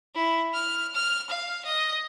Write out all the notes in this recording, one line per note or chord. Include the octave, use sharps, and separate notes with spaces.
E4
F6
F6
F5
D#5